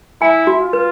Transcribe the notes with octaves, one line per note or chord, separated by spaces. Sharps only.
E4 G#5
F#4
F4
B4